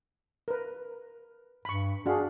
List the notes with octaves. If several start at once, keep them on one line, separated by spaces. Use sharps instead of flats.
A#4 B4
G2 B5 C#6
D4 F#4 G#4 F5